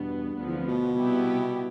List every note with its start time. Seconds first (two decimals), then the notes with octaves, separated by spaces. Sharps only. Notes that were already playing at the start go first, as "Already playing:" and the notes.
Already playing: E2 G2 B2 B3
0.37 D2 D3 F3 B3
0.47 E2
0.58 F2
0.68 B2
0.97 C3 G3 B3 E4 G4